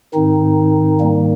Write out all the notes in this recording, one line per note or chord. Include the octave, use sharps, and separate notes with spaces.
G#2 D#3 C4 D#4
G3 A#3